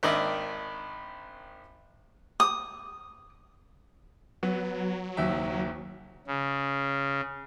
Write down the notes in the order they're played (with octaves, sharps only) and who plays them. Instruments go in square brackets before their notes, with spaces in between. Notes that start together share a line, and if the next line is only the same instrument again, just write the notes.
[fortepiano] G#1 D#3 D4 A#4 D#5 E5
[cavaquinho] D#6
[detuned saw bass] F#3 [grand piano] B3
[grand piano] F#1 D#2 E5
[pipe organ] C#3